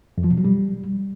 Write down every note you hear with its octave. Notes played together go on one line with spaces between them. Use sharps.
F2
F3
B2
F#3
G3